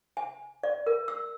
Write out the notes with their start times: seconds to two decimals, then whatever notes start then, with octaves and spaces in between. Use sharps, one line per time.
0.17 G#5
0.63 D5
0.87 A#4
1.08 E6